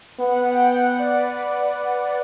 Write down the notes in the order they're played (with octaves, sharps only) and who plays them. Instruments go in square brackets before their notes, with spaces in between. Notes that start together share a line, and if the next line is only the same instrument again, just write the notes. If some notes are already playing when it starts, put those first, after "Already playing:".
[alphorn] B3 [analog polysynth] F#5
[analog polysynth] F#5
G5
F#5
G5
F#5
D5
B4